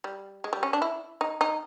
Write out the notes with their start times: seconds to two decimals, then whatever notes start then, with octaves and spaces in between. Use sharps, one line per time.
0.04 G3
0.44 G#3
0.53 G3
0.63 C#4
0.73 D4
0.82 E4
1.21 D#4
1.41 D#4